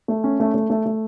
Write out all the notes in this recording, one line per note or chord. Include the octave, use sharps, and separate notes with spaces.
A3
C#4
A3
A3
A3
A3